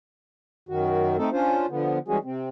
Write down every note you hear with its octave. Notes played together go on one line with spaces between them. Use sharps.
F#2 D#3 F#4
A3 C4 D#4 A4
C#4 D4 F4 C5
D3 F3 B3
E3 G3 G#3 C#4 F#4 G#4
C3 C4